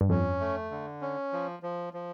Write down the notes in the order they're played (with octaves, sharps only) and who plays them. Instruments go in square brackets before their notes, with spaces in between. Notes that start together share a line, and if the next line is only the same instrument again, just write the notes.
[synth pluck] G2
[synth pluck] F2 [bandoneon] C#4
[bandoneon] A3
D3
C#4
F3
F3
F3